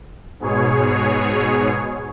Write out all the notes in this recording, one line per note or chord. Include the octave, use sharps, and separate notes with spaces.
G#2 B2 G#4 C#5